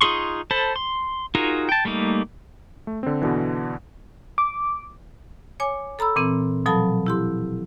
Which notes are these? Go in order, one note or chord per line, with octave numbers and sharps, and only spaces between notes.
D#4 F4 G#4 C6 C#6
A4 C5 A5 B5
C6
D#4 F4 F#4 G#4 A#4
G5 A5
G3 A3 A#3 D#4
A3
D3 C4
B2 D3 E3
D6
C#5 G#5 D6
A4 A#5 B5 E6
A#2 E3 C4
B2 F3 F#3 A4 A5 B5
E4 G4 C6